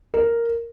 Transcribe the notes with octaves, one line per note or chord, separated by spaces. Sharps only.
A#4